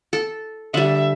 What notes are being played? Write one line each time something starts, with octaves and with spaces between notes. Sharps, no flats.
A4
D3 G3 E5